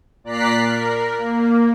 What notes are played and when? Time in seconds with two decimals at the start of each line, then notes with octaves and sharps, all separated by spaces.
0.24 A#2 D5 A#5 F#6 B6 C7
0.63 A#4
1.17 A#3